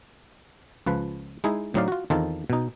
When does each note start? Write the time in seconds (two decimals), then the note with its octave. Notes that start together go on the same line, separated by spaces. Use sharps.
0.86 C#2 F3 B4
1.44 G#3 D#4 E4 G#4
1.74 A2 F#3 C4 D#4 D5 F5
1.88 F4 F#4
2.10 E2 D#3 C4 D#4 F4 A4
2.50 B2 D#4